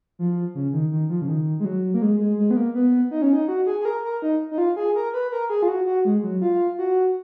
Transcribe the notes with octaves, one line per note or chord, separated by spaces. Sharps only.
F3
C#3
D#3
D#3
F3
C#3
D#3
G#3
F#3
A#3
G#3
G#3
G#3
B3
A#3
B3
D#4
C#4
D#4
F#4
G#4
G#4
A#4
A#4
D#4
D#4
F4
G#4
A#4
B4
A#4
G#4
F4
F#4
F#4
G#3
F#3
F4
F#4